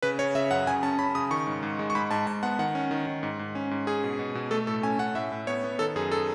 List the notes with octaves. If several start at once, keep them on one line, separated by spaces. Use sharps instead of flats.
C#3 B4
C#3 C#5
C#3 E5
F#2 F#5
C#3 G#5
C#4 A5
C#4 B5
C#3 D#6
D#3 C#6
G#2
G#2
G#3
C#6
G#2 B5
G#2 A5
G#2 A5
B3 F#5
D#3 F#5
C#4
D#3
D#3
G#2
G#2
C#4
G#2
C#4 G#4
B2
B2
B2
A3 A4
A2 A4
C#4 G#5
C#4 F#5
A2 E5
A2
B3 C#5
B3
D#3 A4
F#2 G#4
A4